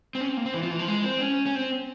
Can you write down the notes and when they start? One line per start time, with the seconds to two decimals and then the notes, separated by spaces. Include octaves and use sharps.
0.15 C4
0.21 C#4
0.29 C4
0.37 A#3
0.46 C4
0.54 E3
0.62 F3
0.70 E3
0.79 F3
0.88 G#3
1.04 C4
1.21 C#4
1.46 C#4
1.55 C4